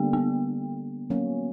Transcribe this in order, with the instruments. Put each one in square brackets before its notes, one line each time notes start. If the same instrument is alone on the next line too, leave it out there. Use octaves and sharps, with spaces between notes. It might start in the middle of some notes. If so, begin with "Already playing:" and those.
Already playing: [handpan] D3 G3 A#3 [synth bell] B3
[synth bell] B3
[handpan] F#3 A#3 C#4